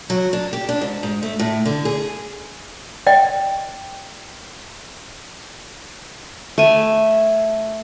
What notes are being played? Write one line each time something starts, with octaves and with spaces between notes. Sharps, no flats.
F#3
D4
G4
D4
G#2
G#2
A3
A2
D3
G#4
D5 D#5 G5
A3 G#5